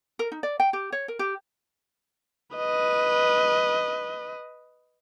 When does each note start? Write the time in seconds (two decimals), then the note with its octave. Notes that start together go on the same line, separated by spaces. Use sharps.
0.19 A#4
0.32 D#4
0.43 D5
0.60 G5
0.73 G4
0.92 C#5
1.08 A#4
1.19 G4
2.56 B4 D#5